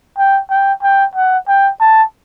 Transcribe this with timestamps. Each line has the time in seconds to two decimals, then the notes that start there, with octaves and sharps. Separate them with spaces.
0.18 G5
0.50 G5
0.83 G5
1.15 F#5
1.48 G5
1.80 A5